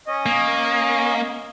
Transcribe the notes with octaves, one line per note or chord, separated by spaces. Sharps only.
C#4 D#5
A#3